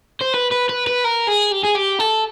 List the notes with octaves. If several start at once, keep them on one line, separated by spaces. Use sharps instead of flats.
C5
B4
B4
B4
B4
A#4
G#4
G4
G#4
G4
A4